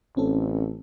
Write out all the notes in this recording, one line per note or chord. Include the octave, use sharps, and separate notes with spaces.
A1 C4 C#4 A4